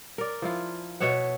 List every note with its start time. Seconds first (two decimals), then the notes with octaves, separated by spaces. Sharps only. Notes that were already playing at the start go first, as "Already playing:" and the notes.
0.18 A#4 D5
0.42 F3 E4 F4
1.00 B2 C#5 E5 F#5